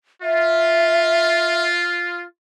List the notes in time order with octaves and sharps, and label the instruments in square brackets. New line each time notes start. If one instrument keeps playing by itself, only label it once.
[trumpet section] F4 [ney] E5